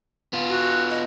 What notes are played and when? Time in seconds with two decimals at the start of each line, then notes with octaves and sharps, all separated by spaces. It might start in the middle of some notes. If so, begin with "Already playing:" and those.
0.33 B3 F4
0.49 F#4
0.90 D#5